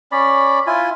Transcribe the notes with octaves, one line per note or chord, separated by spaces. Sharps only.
C#4 D5 B5
E4 F4 G#5